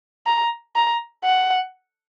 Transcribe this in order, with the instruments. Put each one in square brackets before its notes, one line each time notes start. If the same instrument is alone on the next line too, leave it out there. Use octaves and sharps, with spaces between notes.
[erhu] A#5
A#5
F#5